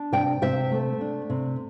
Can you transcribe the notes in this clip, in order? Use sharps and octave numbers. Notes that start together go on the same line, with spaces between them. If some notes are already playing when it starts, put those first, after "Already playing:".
Already playing: D4
C3 D5 G5
C3 C5 E5
A3
D4
C3